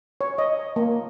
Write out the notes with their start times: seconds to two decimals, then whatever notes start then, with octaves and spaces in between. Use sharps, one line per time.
0.21 C#5
0.38 D#5
0.76 A#3